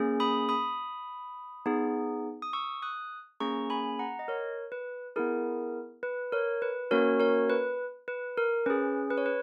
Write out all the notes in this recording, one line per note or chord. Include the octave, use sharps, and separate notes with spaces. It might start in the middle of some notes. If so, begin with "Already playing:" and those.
Already playing: A#3 C#4 G#4
B5 D#6
B5 D#6
B3 D#4 G#4
D#6
C#6 E6
D#6 F#6
A#3 C#4 G#4 A#5 C#6
G#5 B5
F#5 A#5
D#5
A#4 C#5
B4
B3 E4 G#4 A#4
B4
A#4 C#5
B4
A#3 C#4 F#4 A#4 C#5
A#4 C#5
B4
B4
A#4
C#4 G#4 B4
B4
C#5
B4